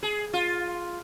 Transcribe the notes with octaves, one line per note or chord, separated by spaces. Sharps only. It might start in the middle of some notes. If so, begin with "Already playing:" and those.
G#4
F4